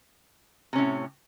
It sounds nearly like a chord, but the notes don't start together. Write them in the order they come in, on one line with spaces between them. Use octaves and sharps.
C3 C#4 A2